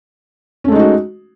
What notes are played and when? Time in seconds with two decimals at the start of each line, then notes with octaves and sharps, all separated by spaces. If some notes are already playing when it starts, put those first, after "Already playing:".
0.64 C#4
0.68 A3
0.72 G#3
0.75 D#4
0.79 F#4